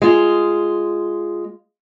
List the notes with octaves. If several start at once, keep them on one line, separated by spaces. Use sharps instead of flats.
G#3 F4